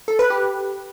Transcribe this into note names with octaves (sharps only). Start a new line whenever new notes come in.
A4
B4
G4